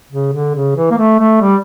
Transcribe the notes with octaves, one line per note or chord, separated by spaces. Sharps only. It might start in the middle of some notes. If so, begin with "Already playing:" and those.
C#3
D3
C#3
E3
A#3
A3
A3
G3